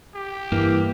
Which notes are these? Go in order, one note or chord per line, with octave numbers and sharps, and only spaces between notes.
G4
G2 E3 A#3